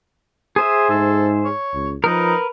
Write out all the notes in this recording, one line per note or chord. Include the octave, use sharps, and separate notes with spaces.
G#4 C5 E5 D#6
G#2 A4
C#5
C#2
F3 D#4 A#4 B4